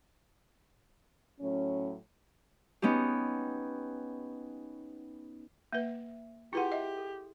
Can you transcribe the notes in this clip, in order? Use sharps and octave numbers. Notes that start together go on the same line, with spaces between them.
A2 F#3 C#4
B3 C#4 D#4 G4
A#3 B4 E5 G5
E4 F4 G4 G#4 B4 F#5 C6
D#5 E5
A4